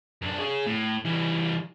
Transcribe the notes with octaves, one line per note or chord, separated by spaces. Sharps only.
F#2 D4
G#4 C#5
A2
E3 G3